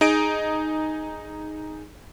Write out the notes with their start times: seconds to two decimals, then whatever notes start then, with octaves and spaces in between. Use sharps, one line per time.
0.01 D#4 G#4 D#5 D7